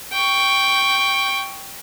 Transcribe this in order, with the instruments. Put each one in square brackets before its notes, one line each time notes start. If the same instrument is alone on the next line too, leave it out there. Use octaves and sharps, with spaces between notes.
[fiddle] G5 C#6